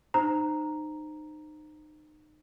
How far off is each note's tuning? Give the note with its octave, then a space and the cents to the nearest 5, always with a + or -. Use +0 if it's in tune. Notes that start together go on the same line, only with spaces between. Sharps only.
D#4 -30 C5 +0 A#5 +0